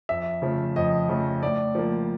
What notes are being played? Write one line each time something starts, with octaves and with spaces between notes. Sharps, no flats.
F2 E5
C#3 F3 A3
F2 D#5
C#3 F3 A3
A2 D5
F3 A#3